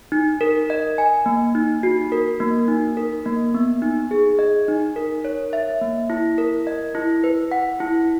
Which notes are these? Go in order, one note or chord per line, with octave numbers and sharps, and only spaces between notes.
D#4
A#4
D#5
G#5
A#3
D#4
F#4
A#4
A#3
D#4
A#4
A#3
B3
D#4
G#4
D#5
D#4
A#4
C#5
E5
A#3
E4
A#4
D#5
E4
B4
F#5
E4